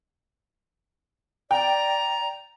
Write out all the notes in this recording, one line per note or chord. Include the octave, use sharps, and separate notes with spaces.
D5 G5 A#5